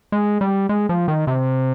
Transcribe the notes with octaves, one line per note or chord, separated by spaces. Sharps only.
G#3
G3
G#3
F3
D#3
C3